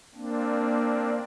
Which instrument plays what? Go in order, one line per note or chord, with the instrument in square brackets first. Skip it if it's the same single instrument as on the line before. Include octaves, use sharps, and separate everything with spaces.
[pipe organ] A#3 C4 D4